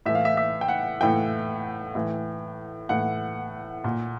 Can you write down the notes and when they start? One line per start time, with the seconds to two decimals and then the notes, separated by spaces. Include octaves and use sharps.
0.06 A2 E3 E5
0.15 F5
0.25 E5
0.37 E5
0.61 G5
0.68 F#5
1.00 A2 E3 G5
1.95 A2 E3
2.89 A2 E3 F#5
3.84 A#2